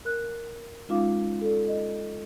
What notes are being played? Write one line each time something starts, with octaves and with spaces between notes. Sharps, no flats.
A#4 F#6
G#3 C#4 D#4 F4 F5 D6
A4 D5
D#5